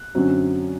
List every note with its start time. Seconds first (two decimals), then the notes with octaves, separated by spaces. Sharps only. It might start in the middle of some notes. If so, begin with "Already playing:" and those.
Already playing: F#6
0.15 F#2 D3 F#3 C4